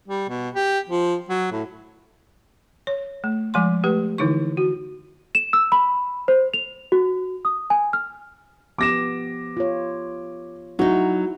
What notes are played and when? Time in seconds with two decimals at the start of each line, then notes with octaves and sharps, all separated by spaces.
0.08 G3
0.29 B2
0.55 G4
0.90 F3
1.29 F#3
1.52 A2
2.87 C#5
3.24 A3
3.54 F3 G#3 G#5 C6
3.84 A3 G4 B4
4.18 D3 E3 D#4 E4 C#6
4.57 F#4
5.35 E7
5.53 E6
5.72 B5
6.28 C5
6.54 F7
6.92 F#4
7.45 D#6
7.70 G#5
7.93 F6
8.78 F3 B3 G4 D6 A#6 E7
9.57 F4 C#5
10.79 F#3 D#4 E4 F#4